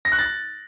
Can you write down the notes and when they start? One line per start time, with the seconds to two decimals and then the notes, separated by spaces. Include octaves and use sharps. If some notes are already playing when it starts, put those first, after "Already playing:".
0.05 A#6
0.12 F#6
0.19 A6